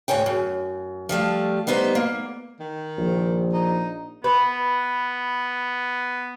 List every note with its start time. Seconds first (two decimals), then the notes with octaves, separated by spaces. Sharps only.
0.08 D2 G#2 G#4 C#5 G5
0.26 F#2
1.09 F3 G3 A3 F5
1.67 G3 B3 D#4 C5
1.95 A#3
2.60 D#3
2.98 A#1
3.53 D#4
4.24 B3 B4